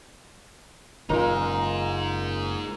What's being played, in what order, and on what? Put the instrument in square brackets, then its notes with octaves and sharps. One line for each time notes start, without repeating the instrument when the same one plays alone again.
[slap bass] F#1 A#2 C#3 [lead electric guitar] D#4 G#4 [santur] F4 A#4